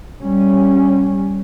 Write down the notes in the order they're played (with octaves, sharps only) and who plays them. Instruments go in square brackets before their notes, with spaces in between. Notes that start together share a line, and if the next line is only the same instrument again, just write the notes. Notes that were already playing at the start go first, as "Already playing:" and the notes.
[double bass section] G3 C#4